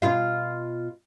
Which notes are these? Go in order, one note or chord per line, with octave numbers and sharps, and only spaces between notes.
B2 F4 F5